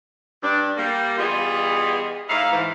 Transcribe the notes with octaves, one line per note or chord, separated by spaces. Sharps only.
G2 D4
G3 A#3
E3 G3 B3 F4 G#4 D#5
A2 D#4 E4 F5
G#2 E3